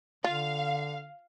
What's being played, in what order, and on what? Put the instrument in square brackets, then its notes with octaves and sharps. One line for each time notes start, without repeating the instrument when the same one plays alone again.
[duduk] D3 [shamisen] F4 [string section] F5